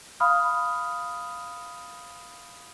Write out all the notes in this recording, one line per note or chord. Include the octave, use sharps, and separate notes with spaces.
F5 B5 D#6 F6